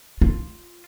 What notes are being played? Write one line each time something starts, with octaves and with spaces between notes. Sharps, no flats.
F4